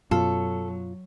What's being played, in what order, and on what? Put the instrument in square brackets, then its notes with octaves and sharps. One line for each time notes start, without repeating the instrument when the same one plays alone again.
[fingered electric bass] F#2 B2 [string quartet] F#3 [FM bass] F4 [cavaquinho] A4